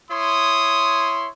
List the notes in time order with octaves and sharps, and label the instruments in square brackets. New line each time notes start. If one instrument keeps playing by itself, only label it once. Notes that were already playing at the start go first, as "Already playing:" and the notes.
[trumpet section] E4 C#5 C6 [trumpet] D#6